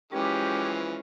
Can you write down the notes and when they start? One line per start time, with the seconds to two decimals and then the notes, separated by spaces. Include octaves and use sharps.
0.12 E3 F3 G#3 C#4 G4